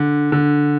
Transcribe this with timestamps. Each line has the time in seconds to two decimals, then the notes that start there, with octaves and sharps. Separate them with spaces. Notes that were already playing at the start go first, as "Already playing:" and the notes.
Already playing: D3
0.32 D3